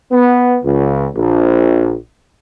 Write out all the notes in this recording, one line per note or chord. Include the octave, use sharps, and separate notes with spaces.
B3
C#2
A#1